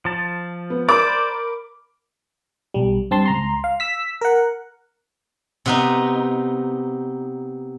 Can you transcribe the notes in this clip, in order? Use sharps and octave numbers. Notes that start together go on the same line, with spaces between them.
F3 A5
B3
A#4 C5 D5 B5 D6
B1 G3
G2 C4 A5 C6
C#2 A#5 C6
F5
E6 B6
A#4 F#5
C3 B3 D#4